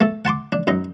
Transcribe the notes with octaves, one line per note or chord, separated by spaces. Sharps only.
A3 A4
F#5 A5 C6 D6
D4
F#2 D#4 A#5